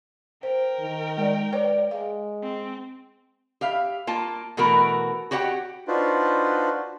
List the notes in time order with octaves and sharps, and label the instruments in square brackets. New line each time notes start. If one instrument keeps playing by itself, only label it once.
[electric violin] A#4 G5 [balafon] C5
[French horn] D#3
[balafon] G#3 D5
[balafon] B4 C#5 [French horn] D5
[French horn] G#3 [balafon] F5
[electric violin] C4
[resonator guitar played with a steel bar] G4 E5 F5
A#3 F4 A5
B2 E3 A3 F#4 A#4
F#4 G4 C#5 D#5 F#5 G5
[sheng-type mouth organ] D4 D#4 F4 F#4 B4 C5